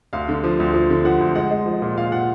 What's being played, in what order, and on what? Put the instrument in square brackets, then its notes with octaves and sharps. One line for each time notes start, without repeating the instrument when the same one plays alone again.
[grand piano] D2 F5
D3
F3
D2
F3
D3
F3 F#5
D2
G#3 F#5
G#3
F3
A#2
A#2 F5
A#2 F#5